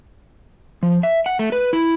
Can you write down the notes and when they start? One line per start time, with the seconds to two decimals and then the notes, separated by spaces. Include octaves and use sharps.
0.83 F3
1.03 E5
1.26 F#5
1.39 A3
1.52 B4
1.73 E4